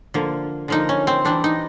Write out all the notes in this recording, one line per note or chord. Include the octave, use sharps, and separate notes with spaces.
D3 F3 A#3
D3 F3 A#3 D#4
C#4
C4
E3 G3 C4 D4
D#4